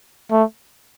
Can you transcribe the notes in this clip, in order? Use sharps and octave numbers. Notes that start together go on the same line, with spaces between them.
A3